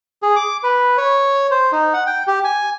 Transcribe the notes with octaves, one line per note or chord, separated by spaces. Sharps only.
G#4
D6
B4
C#5
C5
D#4
F#5
G5
G4
G#5